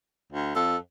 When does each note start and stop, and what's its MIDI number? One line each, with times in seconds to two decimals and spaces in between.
0.32 0.54 38
0.56 0.76 41
0.56 0.77 69